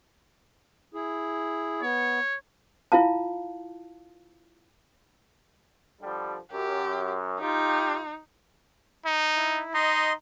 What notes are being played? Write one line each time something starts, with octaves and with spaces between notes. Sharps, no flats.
E4 G#4
B3 C#5
E4 F4 F5 A5
D3 F3 G3
F#2 G4
D#4 F4 G4
D#4
E4
D#4 D#5 C6